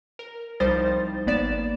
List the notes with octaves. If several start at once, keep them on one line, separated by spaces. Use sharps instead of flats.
A#4
C2 F3 G3 D#4 C5 A6
G#1 A#3 B3 D5 A6 E7